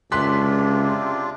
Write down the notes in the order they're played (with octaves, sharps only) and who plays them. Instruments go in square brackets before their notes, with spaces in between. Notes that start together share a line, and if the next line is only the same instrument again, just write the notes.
[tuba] C#2 [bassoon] C3 [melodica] D4 F4 [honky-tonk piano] C6 F#6 B6